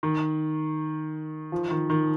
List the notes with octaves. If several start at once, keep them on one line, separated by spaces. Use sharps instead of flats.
D#3
F3
D#3
D#3